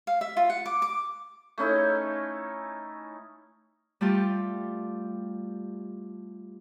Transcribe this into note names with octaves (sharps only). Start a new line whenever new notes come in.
F5
E5
F4
F#5
D6
D6
A3 C#4 D#4 E4
G3 A3 F4 G4